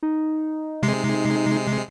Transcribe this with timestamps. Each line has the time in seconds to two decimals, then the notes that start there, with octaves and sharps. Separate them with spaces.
0.03 D#4
0.83 C3 G#3 C7